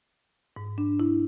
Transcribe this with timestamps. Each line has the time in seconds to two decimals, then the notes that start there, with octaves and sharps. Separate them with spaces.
0.56 G#2
0.78 D4
1.00 E4